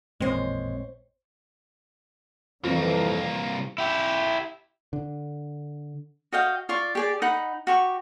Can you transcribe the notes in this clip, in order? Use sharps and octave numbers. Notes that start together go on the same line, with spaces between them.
A1 F2 A#2 G#3 C4 C5 C#5
C2 F2 D#3 E3 G3 A#3 F4
E4 G4
D3
F#4 D#5 F5 G5
F4 D5 C#6
G4 G#4 D5
D#4 D#5 F#5 B5
F#4 G4 C#6